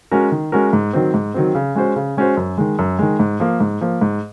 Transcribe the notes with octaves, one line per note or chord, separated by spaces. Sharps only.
G#3 C#4 F#4 A#4
D#3
G#3 C#4 F#4 A#4
G#2
D#3 F#3 C4
G#2
D#3 F#3 C4
C#3
G#3 C#4 F#4 C5
C#3
G#3 C#4 F#4 C5
F#2
D#3 G#3
F#2
D#3 G#3
G#2
F3 A#3
G#2
F3 A#3
G#2